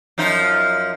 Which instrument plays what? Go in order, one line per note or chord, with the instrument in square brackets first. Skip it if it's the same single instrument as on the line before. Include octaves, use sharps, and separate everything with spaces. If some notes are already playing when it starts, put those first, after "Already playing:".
[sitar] F#2 F3 D#4